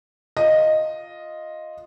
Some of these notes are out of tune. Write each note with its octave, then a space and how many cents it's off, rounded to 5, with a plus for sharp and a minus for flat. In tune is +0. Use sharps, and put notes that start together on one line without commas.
F4 +0 D#5 +0